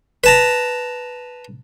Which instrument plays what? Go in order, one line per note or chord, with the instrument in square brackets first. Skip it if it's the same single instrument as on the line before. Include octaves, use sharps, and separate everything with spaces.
[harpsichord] B4 A5 A#5